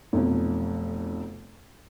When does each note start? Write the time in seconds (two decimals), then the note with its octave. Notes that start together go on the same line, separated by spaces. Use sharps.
0.13 F1 B1 F2